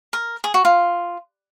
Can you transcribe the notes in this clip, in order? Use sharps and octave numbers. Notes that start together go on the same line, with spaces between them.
A#4
G#4
F#4
F4